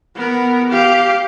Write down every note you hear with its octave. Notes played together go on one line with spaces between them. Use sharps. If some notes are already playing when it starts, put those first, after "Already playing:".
B3 A#4
G4 F5